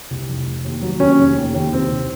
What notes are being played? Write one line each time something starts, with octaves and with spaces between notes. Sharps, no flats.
C2
F1
F1
D#2
F#3
D#2 C#4
F1
D#2
D#2
C2 C4
C2